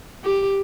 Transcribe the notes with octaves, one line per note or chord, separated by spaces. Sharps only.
G4